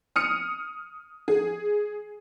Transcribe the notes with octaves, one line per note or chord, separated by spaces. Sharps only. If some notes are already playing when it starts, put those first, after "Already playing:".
D#6 F6 C#7
G#4